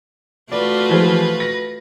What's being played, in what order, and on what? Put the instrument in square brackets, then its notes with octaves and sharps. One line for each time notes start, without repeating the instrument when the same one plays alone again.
[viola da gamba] A3 F4 F#4 [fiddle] B4 [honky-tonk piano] D5
[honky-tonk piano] E3 F3 G#3
A#6